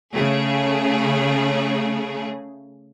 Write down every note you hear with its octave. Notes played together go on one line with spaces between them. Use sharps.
C#3 A3 G#4